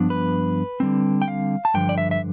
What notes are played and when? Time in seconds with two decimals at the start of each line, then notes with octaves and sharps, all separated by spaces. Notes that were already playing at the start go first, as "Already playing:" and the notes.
Already playing: G2 F3 B3 D4
0.10 B4
0.80 D3 G3 C4
1.22 G5
1.28 F5
1.65 A5
1.74 G2 D3 F3 G5
1.89 D5
1.98 E5
2.11 E5